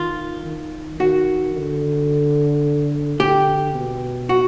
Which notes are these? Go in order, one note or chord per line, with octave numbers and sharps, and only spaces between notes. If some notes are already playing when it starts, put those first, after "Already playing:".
Already playing: D#3 F4
D#3
D#3 F#4
D3
D3 G4
B2
F#4